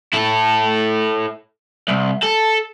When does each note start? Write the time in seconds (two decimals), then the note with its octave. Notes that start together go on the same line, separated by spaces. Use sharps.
0.13 E4 A4
1.89 C2
2.23 A4